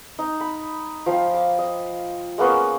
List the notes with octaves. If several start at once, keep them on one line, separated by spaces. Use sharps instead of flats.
D#4
B5
F3 F5 G5
D6
D#5
G#3 A#3 B3 C#4